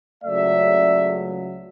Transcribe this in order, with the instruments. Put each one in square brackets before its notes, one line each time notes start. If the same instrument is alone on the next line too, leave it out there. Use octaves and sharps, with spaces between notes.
[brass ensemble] C#2 C#3 F#3 A3 D5 E5